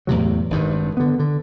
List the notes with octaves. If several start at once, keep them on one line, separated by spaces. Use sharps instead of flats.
E2 A2 C3 F#3
G#1 G2 D#3
D3 B3
D3